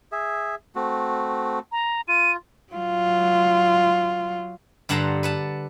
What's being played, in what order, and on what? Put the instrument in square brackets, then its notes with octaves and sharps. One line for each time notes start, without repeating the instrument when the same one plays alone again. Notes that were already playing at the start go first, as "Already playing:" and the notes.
[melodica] G#4 E5
A3 C4 F#4
[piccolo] A#5
[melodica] F4 [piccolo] D#7
[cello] F#3 F4
[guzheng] G2 D3 F#5 A5 A#5 C6
B4 F#5 A5